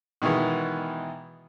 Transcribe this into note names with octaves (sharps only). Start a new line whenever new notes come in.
B2 D#3 E3 G#3 B3